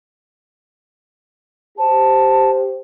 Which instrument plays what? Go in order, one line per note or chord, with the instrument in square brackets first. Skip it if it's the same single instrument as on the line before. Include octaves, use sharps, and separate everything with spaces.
[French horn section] G4 C5 [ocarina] A5